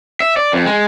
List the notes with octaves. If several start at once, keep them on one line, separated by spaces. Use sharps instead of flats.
E5
D5
F2
G#3